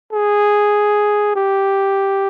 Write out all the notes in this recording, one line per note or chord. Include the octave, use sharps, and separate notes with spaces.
G#4
G4